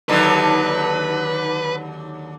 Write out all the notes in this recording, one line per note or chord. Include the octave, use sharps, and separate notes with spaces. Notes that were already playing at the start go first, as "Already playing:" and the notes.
D#2 D3 F#3 B4